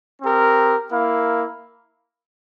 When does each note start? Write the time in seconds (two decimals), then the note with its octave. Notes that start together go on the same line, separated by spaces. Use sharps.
0.22 C4 G4 A#4
0.91 A#3 E4 A#4 F5